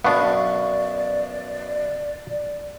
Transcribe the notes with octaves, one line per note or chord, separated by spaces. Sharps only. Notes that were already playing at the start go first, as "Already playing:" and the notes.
F#2 B2 B3 D4 D5 F5 C#6